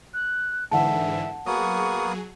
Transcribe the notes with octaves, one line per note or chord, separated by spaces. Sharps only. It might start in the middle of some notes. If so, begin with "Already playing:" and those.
F#6
G#2 D3 E3 E5 F#5 A5
F#3 A#3 B3 G#4 C#6 D#6